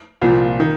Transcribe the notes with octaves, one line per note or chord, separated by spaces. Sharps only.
C2 A#2 F3
D#3